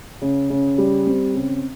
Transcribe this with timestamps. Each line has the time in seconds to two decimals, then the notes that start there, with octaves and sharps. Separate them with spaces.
0.21 C#3
0.50 C#3
0.78 G3
1.07 C4
1.34 C#3